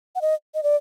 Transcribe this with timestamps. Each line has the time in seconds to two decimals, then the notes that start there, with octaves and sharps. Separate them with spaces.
0.15 F#5
0.21 D#5
0.54 D#5
0.63 D5